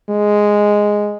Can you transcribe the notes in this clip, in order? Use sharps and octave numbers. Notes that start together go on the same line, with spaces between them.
G#3